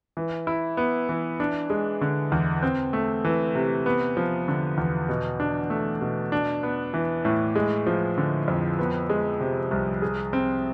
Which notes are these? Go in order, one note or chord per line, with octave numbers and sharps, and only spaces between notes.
E3
E4
B3
E3
D4
G#3
D3
E2
C4
A3
E3
C3
B3
F3
D3
E2
B2
D4
A3
B2
D4
B3
E3
A2
G#3
F3
D3
F2
B3
G#3
C3
C2
G#4
C4